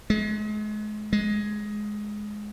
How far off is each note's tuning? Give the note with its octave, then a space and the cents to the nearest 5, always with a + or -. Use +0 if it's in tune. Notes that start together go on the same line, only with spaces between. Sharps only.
G#3 +35
G#3 +10